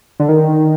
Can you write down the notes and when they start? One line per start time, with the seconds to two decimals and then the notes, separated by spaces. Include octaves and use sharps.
0.20 D3
0.29 D#3